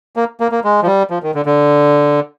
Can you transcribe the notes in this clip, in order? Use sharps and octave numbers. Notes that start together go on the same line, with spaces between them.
A#3
A#3
A#3
G#3
F3
G3
F3
D#3
D3
D3